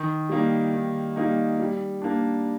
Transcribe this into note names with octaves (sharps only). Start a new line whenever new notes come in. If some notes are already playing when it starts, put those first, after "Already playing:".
Already playing: D#3
G3 A#3 D#4
D#3
G3 A#3 D#4
G3
A#3 D4